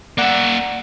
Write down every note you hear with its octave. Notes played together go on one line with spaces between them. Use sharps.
A#3 D5 E5 F#5